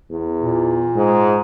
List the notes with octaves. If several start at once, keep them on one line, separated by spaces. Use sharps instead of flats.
E2
A#2
G#2